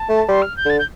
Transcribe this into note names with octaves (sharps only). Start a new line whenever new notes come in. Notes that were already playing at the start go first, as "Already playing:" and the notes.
Already playing: A5
A3
G3 C6
F6
G6
D3 A6
G6